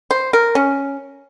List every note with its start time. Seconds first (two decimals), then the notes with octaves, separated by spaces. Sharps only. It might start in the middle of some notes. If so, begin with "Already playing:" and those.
0.11 C5
0.33 A#4
0.55 C#4